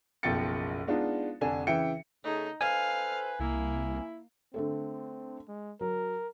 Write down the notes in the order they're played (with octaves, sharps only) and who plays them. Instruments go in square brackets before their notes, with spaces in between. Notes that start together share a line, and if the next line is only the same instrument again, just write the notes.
[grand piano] F#1 B1 F3 G5 A6 C#7
G#3 B3 D4 D#4 F4
F1 D3 D4 G#5
C#3 E3 E5 G5 C#7
[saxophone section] C#3 A3 G#4 [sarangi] D#4
[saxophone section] A4 B4 C5 [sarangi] F5 [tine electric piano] G#5
[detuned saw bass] C2 [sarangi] A#3 [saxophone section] E4
[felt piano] D3 A3 A4 [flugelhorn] C4
[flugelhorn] G#3
[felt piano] F#3 [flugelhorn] A#4